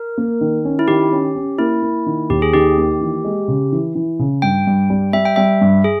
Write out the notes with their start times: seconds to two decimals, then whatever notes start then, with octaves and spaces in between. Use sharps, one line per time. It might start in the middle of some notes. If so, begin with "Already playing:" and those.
Already playing: A#4
0.18 A#3
0.41 D#3
0.65 C#4
0.79 E4
0.88 D#3 G4
1.12 C#4
1.35 C#4
1.59 A#3 E4
1.82 A#3
2.06 D#3
2.30 D#2 G4
2.42 G#4
2.54 D#3 G4
2.77 A#3
3.01 E3
3.24 G#3
3.48 C#3
3.72 E3
3.95 E3
4.19 C#3
4.42 G2 G5
4.67 G2
4.90 G3
5.13 G3 E5
5.25 G5
5.36 G3 E5
5.61 G2
5.84 G#4